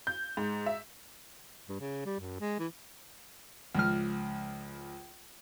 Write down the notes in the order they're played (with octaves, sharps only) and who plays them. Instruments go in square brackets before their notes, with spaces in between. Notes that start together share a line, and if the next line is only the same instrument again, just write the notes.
[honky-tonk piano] G6
G#2
E5
[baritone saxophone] G2
C#3
G3
F#2
G#3
E3
[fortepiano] C#2 F3 F6